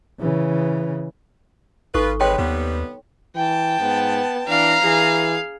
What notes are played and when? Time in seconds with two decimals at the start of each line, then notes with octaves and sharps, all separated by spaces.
0.20 C#3 E3
1.95 G#1 D#4 F4 A4 B4 C#6
2.20 C3 G#3 B4 C#5 G5 C6
2.38 D#2 C3 G3 B3
3.35 E3 G5 A5
3.80 G#2 B3
4.48 E3 D4 F5 A#5
4.83 E3 G#4